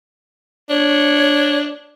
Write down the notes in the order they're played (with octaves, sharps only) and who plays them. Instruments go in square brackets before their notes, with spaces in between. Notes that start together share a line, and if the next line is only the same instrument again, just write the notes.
[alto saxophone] D4 [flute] C#5